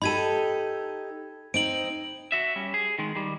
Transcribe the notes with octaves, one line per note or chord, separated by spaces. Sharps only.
D#4 G4 A4 B5 G#6 D#7
C4 D#4 D7 F#7
F#4 E5
G3 C#4
G#4
D#3 G#3
D#3 G3